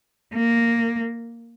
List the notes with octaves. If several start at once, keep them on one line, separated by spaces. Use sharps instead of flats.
A#3